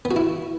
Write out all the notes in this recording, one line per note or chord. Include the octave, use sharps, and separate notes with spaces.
B3
F#4
E4